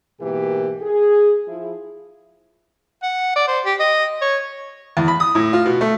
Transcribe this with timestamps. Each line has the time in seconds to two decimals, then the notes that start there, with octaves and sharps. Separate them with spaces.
0.21 G#2 B2 E3 A#3 G4 A#4
0.82 G#4
1.48 F3 E4
3.03 F#5
3.36 D5
3.48 C5
3.66 G4
3.80 D#5
4.22 C#5
4.97 E2
5.08 B5
5.20 D#6
5.35 A2
5.53 F4
5.65 B2
5.81 A3